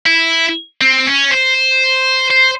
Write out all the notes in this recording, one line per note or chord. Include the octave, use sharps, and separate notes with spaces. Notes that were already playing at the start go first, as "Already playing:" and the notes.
E4
C4
C#4
C5
C5